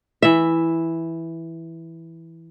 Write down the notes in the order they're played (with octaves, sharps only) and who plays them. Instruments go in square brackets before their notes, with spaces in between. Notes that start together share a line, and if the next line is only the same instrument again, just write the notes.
[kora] E3 E5